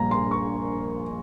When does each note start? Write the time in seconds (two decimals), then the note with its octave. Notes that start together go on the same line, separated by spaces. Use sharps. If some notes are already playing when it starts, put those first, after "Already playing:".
Already playing: A#1 A#2 G3 A#3 A#4 G#5 A#5
0.11 C6
0.31 C#6